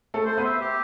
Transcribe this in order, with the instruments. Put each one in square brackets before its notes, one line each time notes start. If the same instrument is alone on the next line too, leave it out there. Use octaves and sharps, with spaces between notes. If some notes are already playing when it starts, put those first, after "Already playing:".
[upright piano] A3 A4
[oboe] C5
[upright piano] B3 B4
[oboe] E5
G4